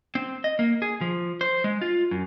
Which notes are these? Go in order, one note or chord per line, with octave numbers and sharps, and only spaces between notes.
C4
D#5
A#3
G#4
F3
C5
G#3
F4
F#2